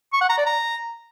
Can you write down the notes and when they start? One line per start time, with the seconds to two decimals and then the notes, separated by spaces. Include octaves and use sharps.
0.13 C#6
0.21 F#5
0.29 A#5
0.38 D5
0.46 A#5